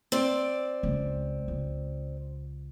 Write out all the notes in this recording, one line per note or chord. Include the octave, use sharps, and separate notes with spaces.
C4 D5
C#2 C#4
C#2